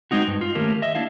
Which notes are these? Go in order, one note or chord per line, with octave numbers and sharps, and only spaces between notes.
G#3 C4 D#4 F#4
G2
F4
D#3 A3 A#3 C#4 G4 A#4
D#5 E5
A#3 D4 E4 F5